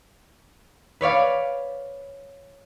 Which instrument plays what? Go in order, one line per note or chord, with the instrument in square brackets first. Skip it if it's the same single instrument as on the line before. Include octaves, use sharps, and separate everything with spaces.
[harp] B4 C#5 D5 F5